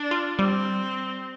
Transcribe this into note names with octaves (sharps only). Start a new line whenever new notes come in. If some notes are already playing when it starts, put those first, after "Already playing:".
Already playing: D4
F4
G3 C4